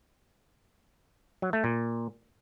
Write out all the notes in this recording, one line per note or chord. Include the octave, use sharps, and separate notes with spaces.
F#3
A3
A#2